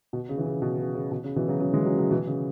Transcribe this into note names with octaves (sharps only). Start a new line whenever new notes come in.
B2
C#3
E3
C#3
B2
C#3
C#3
B2
C#3
B2 E3
C#3 F#3
C#3 F#3
E3 G#3
C#3 F#3
C#3 F#3
B2 E3
C#3